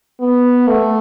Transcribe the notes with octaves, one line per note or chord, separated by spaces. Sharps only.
B3
A3